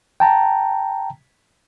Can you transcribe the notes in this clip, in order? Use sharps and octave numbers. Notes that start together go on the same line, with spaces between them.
G5 A5 A#5